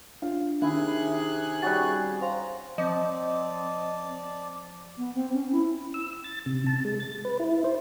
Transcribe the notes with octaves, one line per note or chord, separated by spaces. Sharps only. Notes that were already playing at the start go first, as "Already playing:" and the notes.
D4 F4
C3 D#3 E4 G#4 E5 F#6
G3 C#4 F#4 A6
C5 F5 A#5 C6
F3 C4 D5 D#5 A5
B3
C4
C#4
E4
E6
A6
C3
A5
G#3
A6
B4
E4
C5